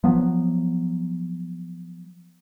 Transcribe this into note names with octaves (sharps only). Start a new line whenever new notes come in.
F3 F#3 B3